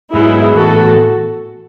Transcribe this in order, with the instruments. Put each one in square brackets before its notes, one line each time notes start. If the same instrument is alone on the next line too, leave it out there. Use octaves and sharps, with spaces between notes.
[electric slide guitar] G#2 F#3 B3 D#4 [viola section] E4 G#4
[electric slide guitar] A2 E3 B3 [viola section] F#4 A4